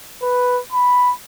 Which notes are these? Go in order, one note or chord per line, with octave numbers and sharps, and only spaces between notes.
B4
B5